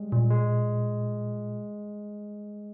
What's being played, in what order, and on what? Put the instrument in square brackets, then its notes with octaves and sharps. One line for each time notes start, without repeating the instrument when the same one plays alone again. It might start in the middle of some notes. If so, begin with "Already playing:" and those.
Already playing: [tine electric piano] G3 G#3
[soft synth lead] A#2
[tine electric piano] G#3